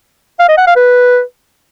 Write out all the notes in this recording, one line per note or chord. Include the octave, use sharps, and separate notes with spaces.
F5
D#5
F#5
F5
B4